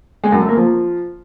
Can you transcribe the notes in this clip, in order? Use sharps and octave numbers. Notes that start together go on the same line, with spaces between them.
G#3
F#2
A3
A#3
F3